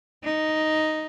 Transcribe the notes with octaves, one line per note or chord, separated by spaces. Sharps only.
D#4